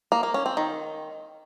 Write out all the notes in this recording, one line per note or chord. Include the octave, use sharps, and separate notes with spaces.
A#3
A#3
C#4
C4
D#3